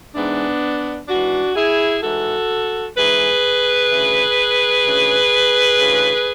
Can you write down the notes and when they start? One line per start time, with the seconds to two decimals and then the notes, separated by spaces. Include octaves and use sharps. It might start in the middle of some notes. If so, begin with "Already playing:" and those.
0.15 G#2 E3 B3 D4
1.09 G#2 E3 D4 F#4
1.56 E4 G#4
2.03 G#2 E3 F#4 A4
2.97 G#2 E3 G#4 B4
3.90 D2 C#3 E3
4.84 D2 C#3 E3
5.78 D2 C#3 E3